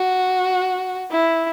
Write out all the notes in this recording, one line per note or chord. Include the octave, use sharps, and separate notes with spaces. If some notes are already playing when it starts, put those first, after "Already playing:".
Already playing: F#4
E4